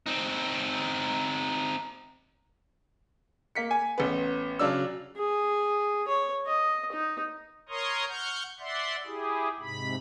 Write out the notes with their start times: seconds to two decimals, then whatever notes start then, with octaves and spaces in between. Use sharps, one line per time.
0.06 C4 D#4
3.55 A#3 B6 C#7
3.71 G#5
3.98 A1 B3
4.59 C#3 F#3 D4 E6
5.17 G#4
6.08 C#5
6.46 D#5
6.92 D#4
7.69 A#4 C#5 A#5 C6 C#6 D#6
8.09 F#5 C#6 F6 G6
8.60 D5 E5 F#5 C6
9.06 E4 G4 G#4
9.60 G#2 C3 B5